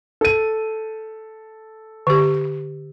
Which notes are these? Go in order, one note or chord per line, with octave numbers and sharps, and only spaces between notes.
A4 D#7
D3 G4